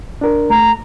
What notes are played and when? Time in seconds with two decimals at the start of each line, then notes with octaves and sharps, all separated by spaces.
0.21 D4 A#4
0.50 A3 A#5